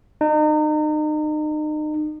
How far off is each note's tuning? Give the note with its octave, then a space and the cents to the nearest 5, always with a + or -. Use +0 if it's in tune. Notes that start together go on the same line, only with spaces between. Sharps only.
D#4 -35